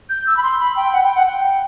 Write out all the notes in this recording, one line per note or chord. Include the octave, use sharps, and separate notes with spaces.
G6
E6
B5
C6
B5
G5
F#5
G5
F#5
G5